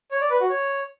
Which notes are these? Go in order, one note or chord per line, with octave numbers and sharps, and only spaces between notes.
C#5
D5
B4
F#4
C#5